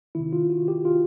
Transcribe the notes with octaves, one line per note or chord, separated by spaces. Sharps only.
C3 D#3 E4
F4
F#4
G4
F4